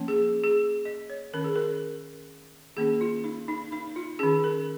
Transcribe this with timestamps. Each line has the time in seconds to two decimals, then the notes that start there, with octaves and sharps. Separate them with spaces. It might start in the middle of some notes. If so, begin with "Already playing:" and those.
Already playing: F3 A#3 C#4
0.08 G#4
0.44 G#4
0.85 D#5
1.10 C#5
1.34 D#3 C#4 A#4
1.44 G#4
1.56 A#4
2.77 D#3 A#3 C#4 G#4
3.01 F4
3.24 D#4
3.48 D#4
3.72 D#4
3.96 F4
4.19 D#3 C#4 G#4
4.44 A#4